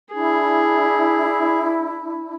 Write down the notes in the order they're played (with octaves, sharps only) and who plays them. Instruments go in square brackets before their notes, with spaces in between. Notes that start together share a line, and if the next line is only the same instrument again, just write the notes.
[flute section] D4 E4 [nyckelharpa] G#4